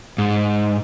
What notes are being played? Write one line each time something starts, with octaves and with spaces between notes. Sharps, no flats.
G#2